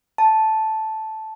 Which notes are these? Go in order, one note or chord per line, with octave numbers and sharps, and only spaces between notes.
A5